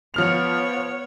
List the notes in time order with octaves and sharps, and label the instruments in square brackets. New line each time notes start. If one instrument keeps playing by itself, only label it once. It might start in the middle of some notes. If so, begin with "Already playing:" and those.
[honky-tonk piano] F3 F6 F7 [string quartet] B3 C#5